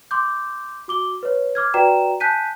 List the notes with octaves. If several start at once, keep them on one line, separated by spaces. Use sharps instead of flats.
C6 D6 G6
F#4 D6 G7
B4 C#5
D6 F6 G#6
F#4 B4 D5 G5 A#5 E7
G#5 A5 F#6 G6 B6 D#7